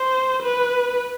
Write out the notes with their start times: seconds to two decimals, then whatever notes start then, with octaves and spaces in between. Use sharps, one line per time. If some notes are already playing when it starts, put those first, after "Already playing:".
Already playing: C5
0.42 B4